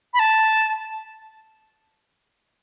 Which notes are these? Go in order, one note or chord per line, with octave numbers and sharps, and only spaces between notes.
B5
A5